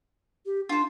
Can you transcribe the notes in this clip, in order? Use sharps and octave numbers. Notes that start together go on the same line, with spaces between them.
G4
D4 F4 C5